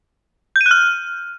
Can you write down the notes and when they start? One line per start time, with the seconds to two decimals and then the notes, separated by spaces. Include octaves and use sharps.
0.56 G6
0.61 D#7
0.66 F#6
0.71 F6